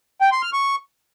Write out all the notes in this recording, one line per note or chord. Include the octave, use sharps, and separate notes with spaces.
G5
C6
F6
C#6